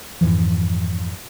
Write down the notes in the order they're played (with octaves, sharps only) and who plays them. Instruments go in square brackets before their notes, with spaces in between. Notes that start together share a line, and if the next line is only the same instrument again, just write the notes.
[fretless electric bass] F2 G#2 E3 F3